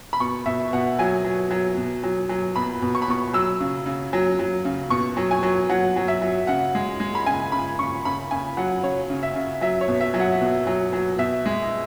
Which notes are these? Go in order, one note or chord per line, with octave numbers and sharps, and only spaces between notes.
B5
B2 C#6
B2 E5
B2 F#5
F#3 G#5
F#3
F#3
B2
F#3
F#3
B2 B5
B2
C#6
B5
B2 C#6
F#3 E6
C#3
C#3
F#3
F#3
C#3
B2 C#6
F#3
G#5
F#3
F#3 F#5
F#3
E5
F#3
C#3 F#5
G#3
G#3
B5
C#3 G#5
C#3 B5
C#3 C#6
C#3 B5
C#3 G#5
F#3 F#5
C#3 C#5
C#3
E5
C#3
F#3 E5
C#5
B2
E5
F#3
F#5
B2
F#3
F#3
B2 E5
G#3